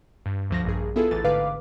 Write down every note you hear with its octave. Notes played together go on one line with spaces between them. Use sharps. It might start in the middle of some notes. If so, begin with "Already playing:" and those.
G2
D2 F3 A#6
A#1 G2 G#4
B3 E4 F4 G#4 A4
A1 D2 E3 A6
A1 G#2 D3 B4 F5 D6